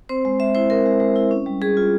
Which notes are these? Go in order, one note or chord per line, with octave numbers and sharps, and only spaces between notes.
C4 C5
G#3
G#3 E5
E4 C5
C4 A#4
G#3
G#3
E4
C#4
G3
G3 G#4
F4